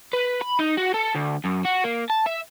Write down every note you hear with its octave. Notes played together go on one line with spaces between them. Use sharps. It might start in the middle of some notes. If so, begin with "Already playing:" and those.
B4
B5
D#4
F#4
A4
D2
F#2
F#4
A#3
A5
E5